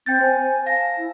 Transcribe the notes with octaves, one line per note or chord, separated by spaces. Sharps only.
C4 G5 G6 A6
C5 G#5
F5 A5 A#6
E4